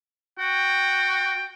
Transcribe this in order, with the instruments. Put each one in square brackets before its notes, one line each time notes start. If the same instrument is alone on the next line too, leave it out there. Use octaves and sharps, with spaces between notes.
[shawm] F#4 [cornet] G5